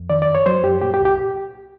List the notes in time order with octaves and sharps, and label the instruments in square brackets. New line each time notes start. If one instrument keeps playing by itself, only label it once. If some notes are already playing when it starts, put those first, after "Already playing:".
Already playing: [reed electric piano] F2
D#3 D5
D5
F#2
C#5
F#3 C5
F#2 G4
A#2 G4
G4
C2
G4